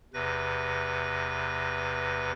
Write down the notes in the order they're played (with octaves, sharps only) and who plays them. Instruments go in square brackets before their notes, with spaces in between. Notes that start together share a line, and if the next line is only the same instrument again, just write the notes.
[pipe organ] E2 C3 B4 A#6